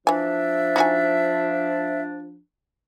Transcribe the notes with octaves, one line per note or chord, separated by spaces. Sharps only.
E3 F3 D4 E5 G#5
D#4 F#4 G#5